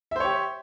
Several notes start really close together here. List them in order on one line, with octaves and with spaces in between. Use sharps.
E5 C5 C#5 G4